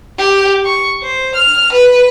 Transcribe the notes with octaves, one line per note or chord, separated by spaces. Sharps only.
G4
C#6
C5
F6
B4